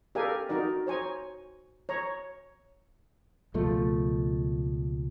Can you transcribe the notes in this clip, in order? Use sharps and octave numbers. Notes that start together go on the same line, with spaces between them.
G4 A4 A#4 D5 F5 G#5
D#4 F#4 A#4 D5
C5 C#5 G#5 A#5
C#5 A#5
C#2 B2 F3 A3